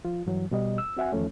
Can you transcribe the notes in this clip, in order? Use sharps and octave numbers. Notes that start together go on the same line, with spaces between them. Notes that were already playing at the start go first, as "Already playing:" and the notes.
F3 F4
G2 E3 F#3
B2 G3 D#5
E6
C4 F#4 E5 F#5 G#5
E2 D#3 F3 A3 C#4